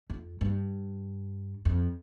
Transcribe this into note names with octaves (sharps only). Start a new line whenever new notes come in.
F2
G2
F2